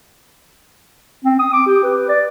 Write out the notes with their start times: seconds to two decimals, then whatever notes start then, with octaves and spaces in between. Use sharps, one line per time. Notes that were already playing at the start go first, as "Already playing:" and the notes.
1.25 C4
1.39 D#6
1.53 D6
1.67 G4
1.83 B4
2.09 D5